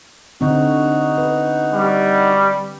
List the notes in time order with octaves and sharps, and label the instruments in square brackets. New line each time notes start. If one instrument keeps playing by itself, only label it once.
[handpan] D3 C4 [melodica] D#4 F#4
[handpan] B4
[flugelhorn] G3